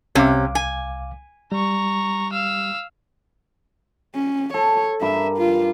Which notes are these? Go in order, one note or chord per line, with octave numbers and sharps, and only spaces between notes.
C2 C3 C#4 F5 D6
G#5
G3 A#5 C#6
F5 E6
C#4
A4 C#5
G2 A#4 E5 B5
F4